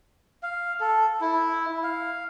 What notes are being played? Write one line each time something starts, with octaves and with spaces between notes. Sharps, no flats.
F5
A4
E4
F5